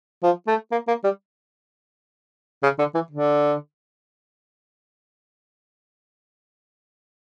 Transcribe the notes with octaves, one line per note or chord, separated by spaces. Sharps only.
F3
A3
A#3
A#3
G3
C#3
D3
E3
D3